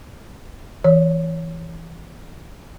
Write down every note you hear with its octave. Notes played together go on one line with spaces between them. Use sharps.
E3 C#5